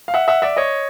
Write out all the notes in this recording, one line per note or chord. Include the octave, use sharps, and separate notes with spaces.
F5
E5 F#5
E5 F#5
D5 E5
C#5 D#5